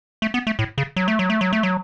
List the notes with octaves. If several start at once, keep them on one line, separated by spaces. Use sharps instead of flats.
A3
B3
A3
A2
C#3
F#3
A3
F#3
A3
F#3
A3
F#3